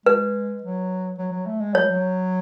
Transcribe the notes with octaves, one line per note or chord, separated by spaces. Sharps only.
G#3 B4
F#3
F#3
F#3
A3
G#3
F#3 C#5
G#3
F#3